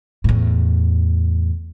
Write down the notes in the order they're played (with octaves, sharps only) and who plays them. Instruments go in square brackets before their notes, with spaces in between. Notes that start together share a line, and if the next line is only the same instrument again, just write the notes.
[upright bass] E2 A2